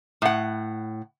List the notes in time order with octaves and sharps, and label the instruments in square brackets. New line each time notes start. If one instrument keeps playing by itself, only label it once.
[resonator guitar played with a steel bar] A2 F#5